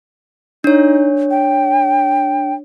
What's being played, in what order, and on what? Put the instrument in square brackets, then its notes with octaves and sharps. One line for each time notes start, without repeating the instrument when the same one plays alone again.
[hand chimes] D4 C#5 [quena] D#4
[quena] G5